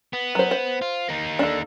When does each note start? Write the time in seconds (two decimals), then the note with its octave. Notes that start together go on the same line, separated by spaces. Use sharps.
0.13 B3
0.35 F#3 C5
0.51 C5
0.82 F4
1.08 A#3 D#4
1.39 D4 A4